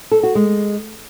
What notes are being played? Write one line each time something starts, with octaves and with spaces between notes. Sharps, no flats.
A4
F#4
G#3